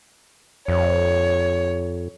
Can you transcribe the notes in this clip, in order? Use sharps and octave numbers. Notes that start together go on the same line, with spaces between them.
F2 C#5